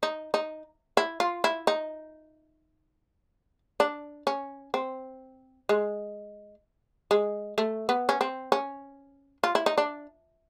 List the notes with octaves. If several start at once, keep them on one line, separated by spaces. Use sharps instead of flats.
D#4
D#4
E4
F4
E4
D#4
D4
C#4
C4
G#3
G#3
A3
B3
C#4
C4
C#4
F4
E4
D#4
D4